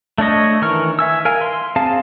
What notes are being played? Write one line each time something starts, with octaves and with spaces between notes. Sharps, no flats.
A3 D4 C#5 D#5
D#3 E3 A#4 C#6 F6
E5 G#5 E6
A#4 F5 G#5
C6
C4 G#4 F5 A5